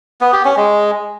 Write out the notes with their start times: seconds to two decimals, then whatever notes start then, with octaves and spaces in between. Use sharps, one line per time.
0.21 B3
0.33 G4
0.45 C#4
0.56 G#3